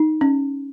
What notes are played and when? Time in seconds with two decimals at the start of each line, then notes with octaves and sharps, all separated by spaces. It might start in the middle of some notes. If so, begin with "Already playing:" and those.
Already playing: D#4
0.21 C#4